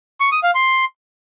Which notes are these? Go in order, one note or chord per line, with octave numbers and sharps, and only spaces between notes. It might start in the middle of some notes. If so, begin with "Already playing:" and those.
C#6
D#6
F5
C6